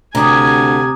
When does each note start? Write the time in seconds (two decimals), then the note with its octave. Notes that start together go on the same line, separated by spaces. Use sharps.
0.15 D2 C3 G#5 A#5 D6 D#6